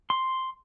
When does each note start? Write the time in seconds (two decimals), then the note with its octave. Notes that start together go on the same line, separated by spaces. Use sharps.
0.10 C6